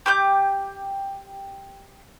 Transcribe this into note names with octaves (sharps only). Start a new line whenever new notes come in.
G4 D6 G6